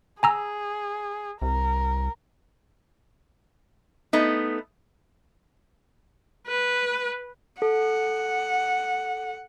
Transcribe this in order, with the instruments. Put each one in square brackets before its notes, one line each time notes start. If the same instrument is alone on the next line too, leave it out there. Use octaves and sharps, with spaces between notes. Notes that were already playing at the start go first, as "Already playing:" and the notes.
[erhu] G#4 [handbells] G#5 A#5 E6
[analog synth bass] C2 [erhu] A#4
[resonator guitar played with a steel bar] A3 B3 D#4
[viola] B4
[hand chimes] A4 [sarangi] F#5